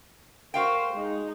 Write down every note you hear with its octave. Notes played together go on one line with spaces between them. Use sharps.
F#4 A#4 C5 F5 G5
G#3 D#4